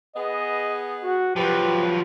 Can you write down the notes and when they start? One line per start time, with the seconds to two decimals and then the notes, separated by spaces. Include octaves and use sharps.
0.16 B3 G#4 D#5
1.04 F#4
1.36 F3 F#3 G4 B4